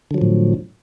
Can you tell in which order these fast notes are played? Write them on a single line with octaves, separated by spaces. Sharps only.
D3 F#3 F3 A2